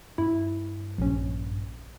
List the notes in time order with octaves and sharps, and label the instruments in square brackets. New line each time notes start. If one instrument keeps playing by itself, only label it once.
[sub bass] G2 [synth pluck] E4
[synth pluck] A#1 C#4